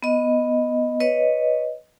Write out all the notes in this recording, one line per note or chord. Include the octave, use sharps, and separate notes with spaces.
B3 D#5
B4 C#5 D#5